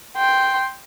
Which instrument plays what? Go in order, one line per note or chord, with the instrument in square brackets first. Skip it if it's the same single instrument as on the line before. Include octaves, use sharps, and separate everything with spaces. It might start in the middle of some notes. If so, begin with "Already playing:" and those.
[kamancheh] G5 C6